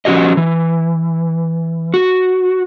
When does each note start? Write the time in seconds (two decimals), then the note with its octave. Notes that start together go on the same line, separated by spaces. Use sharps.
0.05 F3 C#4 F#4 G4 D#5
0.37 E3
1.94 F#4